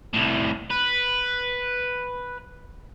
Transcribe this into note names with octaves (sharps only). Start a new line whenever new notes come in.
C2 A2
B4